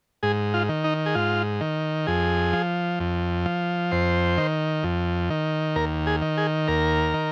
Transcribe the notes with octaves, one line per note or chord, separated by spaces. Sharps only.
G#2 G#4
F4
D#3
D#4
G#4
G#2 F4
D#3
F2 G#4
F3
F2
F3
F2 C5
D#3
F2
D#3
D#2 A#4
G#4
D#3
G#4
D#2 A#4
D#3